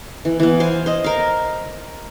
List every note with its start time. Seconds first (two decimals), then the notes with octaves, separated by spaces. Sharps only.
0.25 E3
0.40 E3 B3
0.60 C5 F5 G#5
0.86 C5 D#5
1.04 A#4 F5